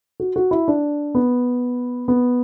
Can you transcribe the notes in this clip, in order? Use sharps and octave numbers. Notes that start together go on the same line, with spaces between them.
F#4
F#4
E4
D4
B3
B3